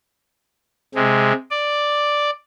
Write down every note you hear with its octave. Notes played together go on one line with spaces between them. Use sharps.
C3 G#3
D5